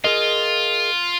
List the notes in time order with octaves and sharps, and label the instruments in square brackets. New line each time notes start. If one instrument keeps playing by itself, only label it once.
[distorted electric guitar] F4 [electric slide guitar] G#4 A#4 D#5